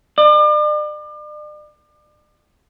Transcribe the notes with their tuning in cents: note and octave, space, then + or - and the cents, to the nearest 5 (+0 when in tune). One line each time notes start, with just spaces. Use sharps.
D5 +40